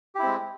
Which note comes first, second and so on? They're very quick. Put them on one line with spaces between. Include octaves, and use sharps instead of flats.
G4 E4 C4 G#3